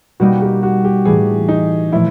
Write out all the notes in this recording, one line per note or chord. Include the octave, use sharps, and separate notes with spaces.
B2 G3 A#3 D#4 F#4
G4
F#4
G4
A2 E3 A3 D4 G#4
D#4
A#2 F3 A3 E4